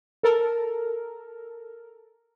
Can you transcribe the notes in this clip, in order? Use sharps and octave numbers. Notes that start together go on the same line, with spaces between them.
A4 A#4